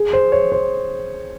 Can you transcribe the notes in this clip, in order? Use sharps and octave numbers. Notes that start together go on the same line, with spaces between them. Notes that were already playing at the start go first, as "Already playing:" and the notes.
Already playing: G#4
C5
C#5
C5